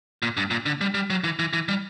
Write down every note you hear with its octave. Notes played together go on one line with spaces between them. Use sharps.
A#2
G2
A#2
D3
G3
G3
F#3
E3
E3
E3
G3